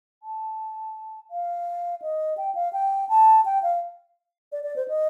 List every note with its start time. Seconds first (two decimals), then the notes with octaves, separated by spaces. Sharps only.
0.23 A5
1.31 F5
2.02 D#5
2.37 G5
2.55 F5
2.73 G5
3.09 A5
3.45 G5
3.63 F5
4.52 D5
4.63 D5
4.76 C5
4.88 D#5